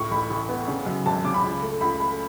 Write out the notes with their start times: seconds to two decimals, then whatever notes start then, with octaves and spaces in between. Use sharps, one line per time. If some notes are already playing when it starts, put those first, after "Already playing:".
Already playing: C#2 A2 C#6
0.11 A1 B5
0.30 A1
0.49 B3
0.68 C#3
0.86 F#2
1.06 G#1 A5
1.24 C#3 D6
1.34 B5
1.44 C#2
1.62 A3
1.81 C#2 B5
2.00 A3 B5